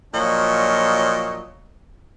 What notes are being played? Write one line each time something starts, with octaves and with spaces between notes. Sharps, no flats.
A#2 F3 F#3 D4 C#5 D#5